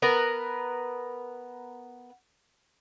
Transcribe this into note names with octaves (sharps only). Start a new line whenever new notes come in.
B3 A#4 B4